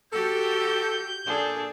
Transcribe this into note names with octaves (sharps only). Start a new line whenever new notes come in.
F#4 G4 A4 G6
A#2 D4 G#4 A4